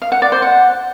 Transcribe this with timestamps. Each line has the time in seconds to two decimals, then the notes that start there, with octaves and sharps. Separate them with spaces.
0.02 F5
0.12 F#5
0.22 D5
0.32 C5
0.42 F#5